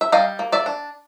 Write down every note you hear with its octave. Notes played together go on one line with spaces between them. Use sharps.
E5
G3 D#5 F5
A#3
D5 E5
D4